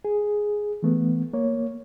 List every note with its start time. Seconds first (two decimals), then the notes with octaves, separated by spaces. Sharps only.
0.05 G#4
0.83 E3 A3 B3
1.33 A#3 C#5